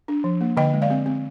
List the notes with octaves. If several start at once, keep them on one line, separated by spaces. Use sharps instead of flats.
D4
F3
A#3
D3 D#5 G5
G#3
D5 F5
C4
C4